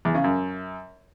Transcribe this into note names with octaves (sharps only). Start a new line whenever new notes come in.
E2
C#3
F#2